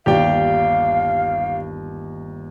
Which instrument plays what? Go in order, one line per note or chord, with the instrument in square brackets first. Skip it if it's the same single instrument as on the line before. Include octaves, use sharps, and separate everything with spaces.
[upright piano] G1 D#2 [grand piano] G4 D5 G5 [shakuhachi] F5